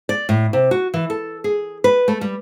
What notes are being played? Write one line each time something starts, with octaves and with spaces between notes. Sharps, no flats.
D5
A2
C3
F#4
E3
A4
G#4
B4
A3
G3